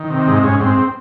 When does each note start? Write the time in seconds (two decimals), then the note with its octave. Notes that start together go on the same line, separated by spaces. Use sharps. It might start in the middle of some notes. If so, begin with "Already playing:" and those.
Already playing: D#3
0.10 C3
0.27 G#2 D#4
0.43 G#2 C#4
0.60 G#2 C4